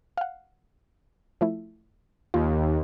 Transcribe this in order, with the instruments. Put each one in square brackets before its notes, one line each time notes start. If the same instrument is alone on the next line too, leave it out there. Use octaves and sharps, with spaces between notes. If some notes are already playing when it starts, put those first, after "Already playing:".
[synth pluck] F5 F#5
F3 A3 E4
[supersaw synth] D#2 [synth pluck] F4